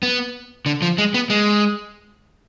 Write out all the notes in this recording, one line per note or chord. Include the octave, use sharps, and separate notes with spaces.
B3
D3
F3
G#3
B3
G#3